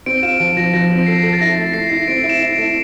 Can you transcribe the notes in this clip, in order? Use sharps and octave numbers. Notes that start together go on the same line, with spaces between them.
C4 D7
F4 E7
F3 D7
F3 A#6
F3 A#6
C4
A4 C7
A4
A6
E4 A#6
A3
A3 C7
E4
C4 D7
E4
E7
E4
D7
A3